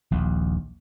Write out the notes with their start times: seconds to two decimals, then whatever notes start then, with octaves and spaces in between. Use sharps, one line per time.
0.11 D#1 A#1 D#2